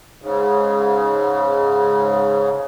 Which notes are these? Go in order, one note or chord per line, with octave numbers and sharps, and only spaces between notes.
G#2 C#3